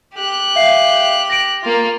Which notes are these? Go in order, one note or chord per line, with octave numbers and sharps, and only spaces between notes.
G4 F#6
E5 F5 C7
A#6 D7
A#3 F4